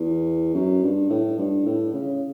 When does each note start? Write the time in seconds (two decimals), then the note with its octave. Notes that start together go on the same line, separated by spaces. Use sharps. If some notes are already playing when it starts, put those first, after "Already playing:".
Already playing: E2
0.54 F#2
0.83 G2
1.10 A2
1.38 G2
1.66 A2
1.93 C#3